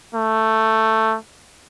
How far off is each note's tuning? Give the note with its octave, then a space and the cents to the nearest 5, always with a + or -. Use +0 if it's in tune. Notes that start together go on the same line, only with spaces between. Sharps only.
A3 +10